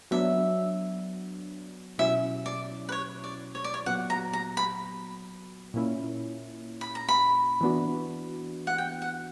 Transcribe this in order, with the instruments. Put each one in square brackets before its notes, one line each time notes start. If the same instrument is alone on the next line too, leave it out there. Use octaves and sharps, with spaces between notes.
[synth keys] F#3 B3 D4 [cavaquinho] E5
[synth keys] B2 F#3 C#4 E4 [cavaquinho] E5
[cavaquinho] D5
B4
C#5
D5
C#5
D5
C#5
[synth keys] A#2 F#3 B3 F#4 [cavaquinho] F#5
[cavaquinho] A#5
A#5
B5
[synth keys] A#2 A#3 C#4 E4
[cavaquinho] B5
A#5
B5
[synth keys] E3 B3 D4 F#4
[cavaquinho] F#5
G5
F#5